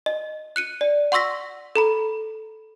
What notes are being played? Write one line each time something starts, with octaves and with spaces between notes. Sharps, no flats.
D#5
F#6 C#7 D#7
D5
F#5 C6 C#6 E6 A#6 B6
A4 A#5 B5